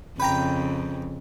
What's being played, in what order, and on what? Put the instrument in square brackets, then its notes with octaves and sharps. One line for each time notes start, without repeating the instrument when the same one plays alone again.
[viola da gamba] F2 C#3 [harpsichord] B4 G5 A#5